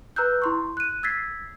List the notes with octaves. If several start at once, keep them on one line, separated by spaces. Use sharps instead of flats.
B4 A#5 E6 F#6 G6
E4 C6 C#6
F#6 D#7
E6 G#6 A6 B6 C7